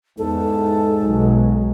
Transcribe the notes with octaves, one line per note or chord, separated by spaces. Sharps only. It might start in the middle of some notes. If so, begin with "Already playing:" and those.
E2 G#2 A4
B1 F#3 G#3